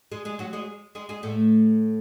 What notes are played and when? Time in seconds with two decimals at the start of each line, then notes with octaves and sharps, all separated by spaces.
0.12 G#3 G#4
0.25 G#3 G#4
0.39 F#3 F#4
0.53 G#3 G#4
0.95 G#3 G#4
1.09 G#3 G#4
1.23 A2 A3